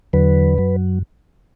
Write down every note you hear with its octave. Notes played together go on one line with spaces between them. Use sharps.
E2 D3 F#3 B4
F#2 F#3